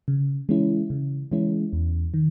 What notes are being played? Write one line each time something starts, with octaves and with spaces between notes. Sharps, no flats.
C#3
E3 G#3 C#4 E4
C#3
E3 G#3 C#4 E4
E2
D#3